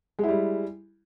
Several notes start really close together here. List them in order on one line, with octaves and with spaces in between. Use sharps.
G#3 E4 G3